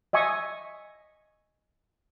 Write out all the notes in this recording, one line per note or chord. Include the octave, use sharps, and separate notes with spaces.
D#5 E5 G#5 C#6 D#6